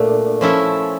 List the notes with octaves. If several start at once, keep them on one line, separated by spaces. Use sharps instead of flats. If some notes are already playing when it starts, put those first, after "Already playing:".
Already playing: A#2 A3 D4
F3 C#4 E4 A4